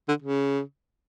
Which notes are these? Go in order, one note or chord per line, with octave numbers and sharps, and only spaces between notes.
D3
C#3